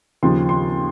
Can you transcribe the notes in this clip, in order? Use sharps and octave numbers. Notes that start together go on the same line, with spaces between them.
D#2 C#3 F3 C6
C6